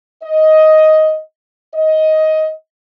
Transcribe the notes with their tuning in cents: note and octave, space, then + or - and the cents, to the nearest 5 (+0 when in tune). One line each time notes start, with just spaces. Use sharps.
D#5 +10
D#5 +15